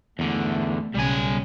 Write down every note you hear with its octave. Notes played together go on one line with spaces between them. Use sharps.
E2 D3 A3
B1 C#3 G3 G#5